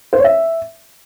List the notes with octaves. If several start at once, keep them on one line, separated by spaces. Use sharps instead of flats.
C5
C#5
E5